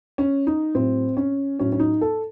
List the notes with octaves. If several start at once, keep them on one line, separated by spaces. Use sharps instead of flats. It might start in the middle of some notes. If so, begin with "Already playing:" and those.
C#4
D#4
A2 F#3 C4
C#4
A2 F#3 C#4
C#4
D#4
A4